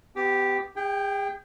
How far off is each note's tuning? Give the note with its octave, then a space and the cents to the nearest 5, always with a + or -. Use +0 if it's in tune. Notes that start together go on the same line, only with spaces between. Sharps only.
B3 +30 G4 +0
G#4 -40 G5 +0